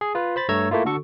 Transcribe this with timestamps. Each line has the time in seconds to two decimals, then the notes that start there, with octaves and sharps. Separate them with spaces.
0.01 G#4
0.15 F4 B4
0.36 C5 B5 A6
0.49 G2 A3 C#5 A#5 E6 G#6
0.71 A3 A#3 E4 F4
0.85 D3 F#4 A4 C#6